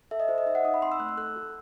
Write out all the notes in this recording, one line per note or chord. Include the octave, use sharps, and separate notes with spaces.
A4 E5
D#5
F#4 C5
D#5
D#4 E5
F#5
D#4 D#6
B5
C4 C6
E6
A3 F#6
E6
A4 F#6
F#4